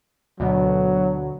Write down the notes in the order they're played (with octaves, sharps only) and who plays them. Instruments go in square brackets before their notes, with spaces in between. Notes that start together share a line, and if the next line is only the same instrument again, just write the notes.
[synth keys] D2 B2 [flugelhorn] F#3